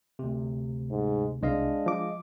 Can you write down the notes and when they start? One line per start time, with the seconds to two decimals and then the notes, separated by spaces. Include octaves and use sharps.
0.19 D2 C3
0.91 G#2
1.43 C2 G#3 D4 D#5 F5
1.86 F3 D6